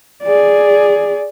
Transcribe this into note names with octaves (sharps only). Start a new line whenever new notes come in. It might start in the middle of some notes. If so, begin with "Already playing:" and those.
G#4 D5